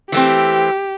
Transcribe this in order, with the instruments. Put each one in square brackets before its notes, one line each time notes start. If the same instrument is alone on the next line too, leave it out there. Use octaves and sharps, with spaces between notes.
[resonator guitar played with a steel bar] E3 A3 C4 [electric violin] G4